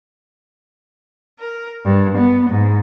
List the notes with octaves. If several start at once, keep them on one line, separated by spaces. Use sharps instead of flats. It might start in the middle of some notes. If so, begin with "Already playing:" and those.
A#4
G2
B3
G#2